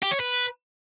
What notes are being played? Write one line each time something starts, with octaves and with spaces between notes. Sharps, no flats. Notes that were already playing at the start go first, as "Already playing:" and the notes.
G4
C#5
B4